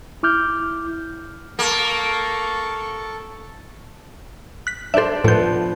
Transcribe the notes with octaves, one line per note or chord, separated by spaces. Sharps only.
E4 D6 F6 G6
A#3 A4 C#6
F#6 B6
D4 A4 C5 E5
A2 F3 B3 G6